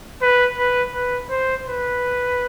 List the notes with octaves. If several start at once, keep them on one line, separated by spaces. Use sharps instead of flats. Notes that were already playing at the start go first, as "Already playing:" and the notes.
B4
B4
B4
C5
B4